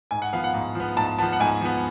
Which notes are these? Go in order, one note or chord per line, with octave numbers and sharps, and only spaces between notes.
G#2 G#5
F#5
F3 B3 F5
F#5
G#2
F3 B3
G#2 A5
F3 B3 A5
F#5
G#2 G#5
F3 B3